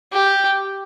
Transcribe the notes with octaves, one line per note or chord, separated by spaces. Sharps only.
G4